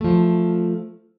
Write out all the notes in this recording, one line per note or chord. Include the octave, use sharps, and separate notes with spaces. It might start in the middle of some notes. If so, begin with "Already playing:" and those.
F3 A3